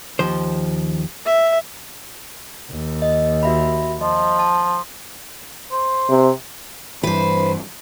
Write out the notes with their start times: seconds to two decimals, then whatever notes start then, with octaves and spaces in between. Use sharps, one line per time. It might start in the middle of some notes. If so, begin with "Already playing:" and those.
0.19 D#2 F3 C5
1.26 E5
2.71 D#2
3.02 D#5
3.43 F#4 E5 B5
4.01 F3 D#5
4.39 A5
5.71 C5
6.10 C3
7.03 G2 E3 B4 C5